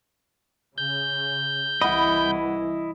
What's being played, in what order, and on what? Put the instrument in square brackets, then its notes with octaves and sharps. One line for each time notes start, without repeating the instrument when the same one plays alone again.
[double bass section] C#3 [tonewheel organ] G6
[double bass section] C2 E3 [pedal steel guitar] E4 D#5 [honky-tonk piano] F#5 B5